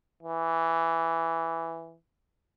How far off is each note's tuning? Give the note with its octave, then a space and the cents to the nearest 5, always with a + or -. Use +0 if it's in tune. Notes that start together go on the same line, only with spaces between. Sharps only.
E3 +5